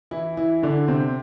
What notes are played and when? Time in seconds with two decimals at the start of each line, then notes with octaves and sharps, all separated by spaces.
0.11 E3 E4
0.37 E3 E4
0.62 D3 D4
0.88 C3 C4